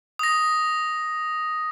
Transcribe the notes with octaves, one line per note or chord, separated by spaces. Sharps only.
D#6 A#6